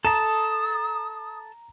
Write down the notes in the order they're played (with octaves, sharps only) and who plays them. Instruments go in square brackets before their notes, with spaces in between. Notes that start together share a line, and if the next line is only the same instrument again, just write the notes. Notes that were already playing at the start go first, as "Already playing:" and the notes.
[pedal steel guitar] A4 A5 [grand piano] A#5 E7 [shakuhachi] D#6